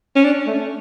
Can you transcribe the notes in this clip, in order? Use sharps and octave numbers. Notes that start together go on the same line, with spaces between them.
C#4
D4
A3